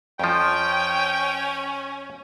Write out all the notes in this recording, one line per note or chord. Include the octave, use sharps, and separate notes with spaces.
F2 F3 C#4 G5